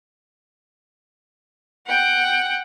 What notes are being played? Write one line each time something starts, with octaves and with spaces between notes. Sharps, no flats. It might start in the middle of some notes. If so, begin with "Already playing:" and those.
F#5 G5